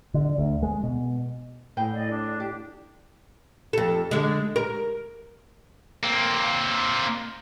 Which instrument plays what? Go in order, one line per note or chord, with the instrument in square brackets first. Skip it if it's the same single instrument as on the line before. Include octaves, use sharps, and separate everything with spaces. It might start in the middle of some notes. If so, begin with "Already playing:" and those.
[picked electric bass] D3
D2
G#3
B2
[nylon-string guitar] A2 G#4 G5
[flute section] D5 D#5
D4
[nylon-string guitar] G4
[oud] F2 A4
D3 G#3
A#4
[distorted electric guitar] A#3 C4